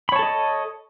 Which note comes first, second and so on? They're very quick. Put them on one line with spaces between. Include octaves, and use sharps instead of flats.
B5 C#5 A5 A4 D#5